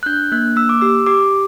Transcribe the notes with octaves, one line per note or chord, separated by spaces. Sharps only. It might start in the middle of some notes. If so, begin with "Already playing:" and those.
F#6
D4 G6
A#3 F#6
A#3 E6
D6
G4 E6
G4 D6